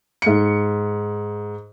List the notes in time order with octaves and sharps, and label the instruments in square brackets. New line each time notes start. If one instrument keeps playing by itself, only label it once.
[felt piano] G#2 C#7